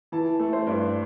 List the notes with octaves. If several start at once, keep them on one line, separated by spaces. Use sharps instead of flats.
E3 A5
A3
C5
G2